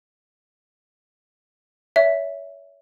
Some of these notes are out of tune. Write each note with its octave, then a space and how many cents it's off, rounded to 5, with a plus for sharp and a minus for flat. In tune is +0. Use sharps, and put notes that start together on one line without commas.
C#5 +30 E5 +0